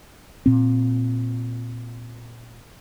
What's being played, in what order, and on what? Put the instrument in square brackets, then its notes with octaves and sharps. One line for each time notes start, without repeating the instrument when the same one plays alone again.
[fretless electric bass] A#2 C4